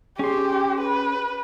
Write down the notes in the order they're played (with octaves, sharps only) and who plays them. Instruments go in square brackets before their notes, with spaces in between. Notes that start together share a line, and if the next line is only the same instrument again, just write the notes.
[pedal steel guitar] C#4 C6 [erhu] G4 [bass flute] G#4
[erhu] B4